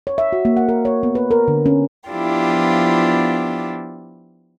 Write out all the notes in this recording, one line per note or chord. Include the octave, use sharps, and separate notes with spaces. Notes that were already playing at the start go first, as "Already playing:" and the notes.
C#5
E5
F#4
A#3
F#5
A#4
C#5
B3
B4
A#4
D3
C#4
F3 B3 D4 E4 F4 G4